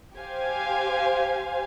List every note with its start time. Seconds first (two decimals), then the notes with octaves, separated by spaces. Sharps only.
0.17 G4 C5 F5 G#5